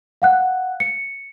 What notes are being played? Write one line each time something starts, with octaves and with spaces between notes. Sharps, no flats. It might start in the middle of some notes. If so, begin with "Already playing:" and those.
F5 F#5 F#6
C#7